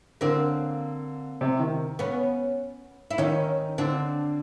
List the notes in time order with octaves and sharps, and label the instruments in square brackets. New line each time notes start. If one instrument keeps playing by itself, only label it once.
[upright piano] D3 [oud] A#3 C4
[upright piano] C3
D#3
[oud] B3 C#4
E4
[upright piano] D#3 [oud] C#4 D#4
[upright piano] D3 [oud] C4 D4